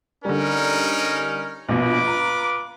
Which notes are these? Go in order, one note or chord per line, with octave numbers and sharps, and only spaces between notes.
D3 G3 C#4 D#4 A#4
A#1 B2 F4 B4 D6
A#5